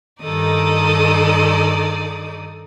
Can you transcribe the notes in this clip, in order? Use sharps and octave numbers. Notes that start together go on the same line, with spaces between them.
G2 D#3 D#4 A4 D5 D#6